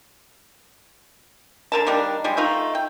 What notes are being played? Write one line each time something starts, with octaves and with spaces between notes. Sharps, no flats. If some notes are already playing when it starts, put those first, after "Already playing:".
D3 A#4 A5
D#3 G3 A#3 D4
F3 G3 G#3
A3 D#4 F4
G5